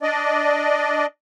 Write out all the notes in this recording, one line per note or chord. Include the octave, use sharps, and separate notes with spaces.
D4 D5 D#5